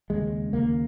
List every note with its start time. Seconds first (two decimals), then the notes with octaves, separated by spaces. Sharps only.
0.10 D#2 C#3 G#3
0.53 D#2 C#3 A#3